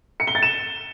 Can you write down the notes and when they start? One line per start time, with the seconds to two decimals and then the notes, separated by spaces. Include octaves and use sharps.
0.20 C#7
0.27 G7
0.35 A6
0.43 E7